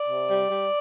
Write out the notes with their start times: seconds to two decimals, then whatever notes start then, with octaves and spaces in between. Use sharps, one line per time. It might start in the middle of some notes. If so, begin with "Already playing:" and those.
Already playing: D5
0.09 C3
0.29 G3
0.50 G3